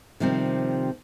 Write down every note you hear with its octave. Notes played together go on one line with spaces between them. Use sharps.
C3 D#3 F3 G3 C4